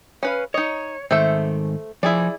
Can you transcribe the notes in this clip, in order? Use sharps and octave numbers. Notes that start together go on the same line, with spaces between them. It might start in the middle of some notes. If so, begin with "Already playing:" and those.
C#4 B4 F5
D#4 C#5 D#5
G#2 D#3 A3 C5 E5
F3 E4 G#4 D5 G#5